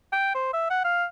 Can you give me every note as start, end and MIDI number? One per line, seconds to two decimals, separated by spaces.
0.13 0.32 79
0.35 0.49 72
0.53 0.69 76
0.70 0.83 78
0.84 1.05 77